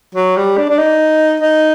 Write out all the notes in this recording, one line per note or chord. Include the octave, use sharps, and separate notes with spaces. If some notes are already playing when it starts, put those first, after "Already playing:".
F#3
G3
D4
D4
D#4
D#4